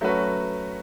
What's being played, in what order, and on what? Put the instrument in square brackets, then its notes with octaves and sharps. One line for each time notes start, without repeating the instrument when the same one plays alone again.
[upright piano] F#3 A3 C#4 F#4 B4